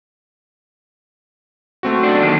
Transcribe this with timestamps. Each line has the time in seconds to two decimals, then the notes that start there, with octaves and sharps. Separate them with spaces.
1.83 A3 C4 F#4
2.04 B1 D4
2.22 D#2 D#3 D7